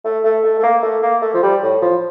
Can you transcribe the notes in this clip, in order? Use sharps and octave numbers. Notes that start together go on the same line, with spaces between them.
A3
A3
A3
A3
A#3
A3
A#3
A3
F3
G3
A2
F3